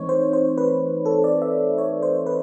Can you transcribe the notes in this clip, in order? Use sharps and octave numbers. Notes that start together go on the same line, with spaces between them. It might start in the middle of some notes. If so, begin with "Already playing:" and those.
Already playing: E3 A3 C4 D#4 C#5
C5
C5
B4
A4
D5
E5
C#5
C5
B4